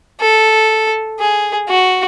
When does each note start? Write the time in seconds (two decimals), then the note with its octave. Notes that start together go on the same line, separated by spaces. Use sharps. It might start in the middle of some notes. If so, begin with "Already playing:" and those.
0.20 A4
1.19 G#4
1.68 F#4